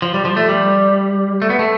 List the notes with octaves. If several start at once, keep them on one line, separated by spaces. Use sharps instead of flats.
F3
G3
F3
A3
G3
A3
B3
A3